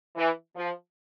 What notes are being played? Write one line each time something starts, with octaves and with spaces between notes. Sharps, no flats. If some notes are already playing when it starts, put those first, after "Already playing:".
E3
F3